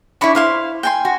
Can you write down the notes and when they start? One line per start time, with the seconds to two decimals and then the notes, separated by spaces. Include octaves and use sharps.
0.21 D4 E4 C#5 B5 C#6
0.35 E4 C5 F5 C6
0.83 G5 G#5 C6
1.05 F#4